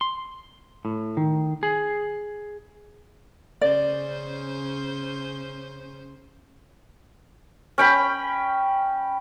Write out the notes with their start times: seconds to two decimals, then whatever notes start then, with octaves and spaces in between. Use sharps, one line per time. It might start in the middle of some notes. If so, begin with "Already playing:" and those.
0.01 C6
0.85 A2
1.17 D#3
1.63 G#4
3.61 C#3 C#4 C5 D5
7.78 C#4 G5 B5